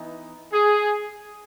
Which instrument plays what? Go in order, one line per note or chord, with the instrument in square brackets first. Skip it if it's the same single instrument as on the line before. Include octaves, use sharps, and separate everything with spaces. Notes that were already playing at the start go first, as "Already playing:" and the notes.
Already playing: [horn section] E3 B3 D#4
G#4